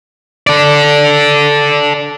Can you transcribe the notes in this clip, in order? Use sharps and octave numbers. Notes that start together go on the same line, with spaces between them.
A4 D5